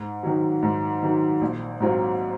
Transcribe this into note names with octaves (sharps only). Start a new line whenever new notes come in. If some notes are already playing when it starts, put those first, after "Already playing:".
Already playing: G#2
D#3 F#3
G#2
D#3 F#3
A#1
G#2 F#3 C4 F4